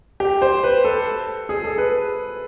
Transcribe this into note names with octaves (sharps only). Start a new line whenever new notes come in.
G4
C5
B4
A4
G#4
A4
B4